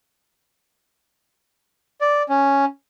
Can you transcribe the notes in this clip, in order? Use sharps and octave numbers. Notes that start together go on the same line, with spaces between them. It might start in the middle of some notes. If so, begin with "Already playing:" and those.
D5
C#4